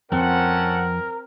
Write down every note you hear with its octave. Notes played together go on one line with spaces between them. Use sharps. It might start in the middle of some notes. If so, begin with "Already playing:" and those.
F2 F3 C4 C#4 A4 A#4 F#5